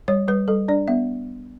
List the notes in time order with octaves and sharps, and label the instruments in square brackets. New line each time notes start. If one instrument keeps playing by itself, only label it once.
[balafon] G3 C#5
G3 B4
G3 A4
D4 D5
B3 E5